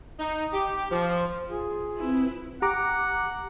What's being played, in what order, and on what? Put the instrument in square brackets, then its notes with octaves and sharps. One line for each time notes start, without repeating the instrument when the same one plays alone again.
[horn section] D#4
G4
F3
[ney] F4 [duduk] G#4
[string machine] C4 B4 [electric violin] E4
[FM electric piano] G4 A#5 D6 [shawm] F#5